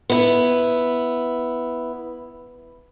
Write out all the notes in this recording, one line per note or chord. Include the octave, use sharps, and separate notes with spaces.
B3 E4